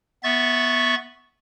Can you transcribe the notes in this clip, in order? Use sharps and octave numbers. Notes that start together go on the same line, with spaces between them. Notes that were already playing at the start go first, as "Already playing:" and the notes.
B3 E5 C#6 A6